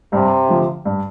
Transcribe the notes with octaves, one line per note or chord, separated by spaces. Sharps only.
G2 C3
D3 F3
G2